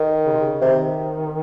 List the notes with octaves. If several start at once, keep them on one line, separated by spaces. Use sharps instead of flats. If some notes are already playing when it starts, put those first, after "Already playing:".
Already playing: D#3
C#3
C3
C#3
C3 D#3